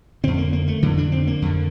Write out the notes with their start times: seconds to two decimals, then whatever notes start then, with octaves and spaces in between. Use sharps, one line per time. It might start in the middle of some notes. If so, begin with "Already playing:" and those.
0.24 F2 D3 C4
0.38 A#3
0.53 A#3
0.68 A3
0.82 F2 D3 E3
0.98 D4
1.12 C4
1.27 A#3
1.42 F2 D3